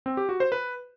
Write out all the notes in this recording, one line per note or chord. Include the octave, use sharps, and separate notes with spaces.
C4
G4
F#4
C5
B4